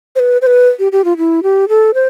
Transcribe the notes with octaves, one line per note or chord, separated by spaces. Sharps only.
C5
B4
C5
B4
G4
G4
F4
E4
G4
A4
C5